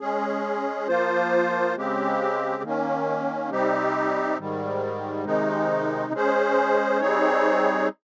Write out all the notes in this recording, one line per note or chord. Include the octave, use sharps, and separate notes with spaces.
G#3 C#4 G#4
F3 A#3 F4 C5
C#3 G#3 C4 G4
D#3 A#3 C#4
C3 G3 C4 D#4 G4
G#2 D#3 G3
C3 D#3 G#3 D#4
G#3 C#4 G#4 C5
G3 C4 D#4 G#4 C#5